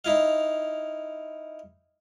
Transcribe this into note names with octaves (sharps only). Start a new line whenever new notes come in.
D#4 E4 F5